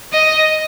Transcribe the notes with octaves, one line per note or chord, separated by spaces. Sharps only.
D#5